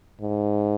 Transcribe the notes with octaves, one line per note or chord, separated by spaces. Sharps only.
G#2